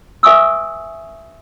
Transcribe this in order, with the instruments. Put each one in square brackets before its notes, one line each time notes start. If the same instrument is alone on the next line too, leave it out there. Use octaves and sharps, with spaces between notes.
[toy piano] B4 E5 G#5 C#6 D#6 E6